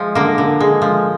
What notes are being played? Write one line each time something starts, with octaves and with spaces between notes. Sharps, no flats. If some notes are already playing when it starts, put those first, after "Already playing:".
Already playing: F3 G#3
D3 A#3
D3
G#3
F3